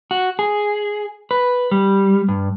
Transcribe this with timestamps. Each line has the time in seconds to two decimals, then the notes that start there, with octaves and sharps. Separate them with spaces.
0.11 F#4
0.39 G#4
1.31 B4
1.71 G3
2.28 G2